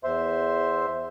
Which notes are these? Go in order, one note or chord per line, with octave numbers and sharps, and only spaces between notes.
E2 C5 E5 C6